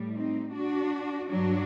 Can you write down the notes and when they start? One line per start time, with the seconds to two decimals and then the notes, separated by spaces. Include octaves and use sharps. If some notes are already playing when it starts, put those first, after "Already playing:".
Already playing: A2 G3
0.15 C4 D#4
0.54 D4 F#4
1.30 G2 F#3 D4 F#4